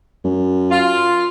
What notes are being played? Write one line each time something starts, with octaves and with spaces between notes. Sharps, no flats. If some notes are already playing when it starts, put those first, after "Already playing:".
F#2
F4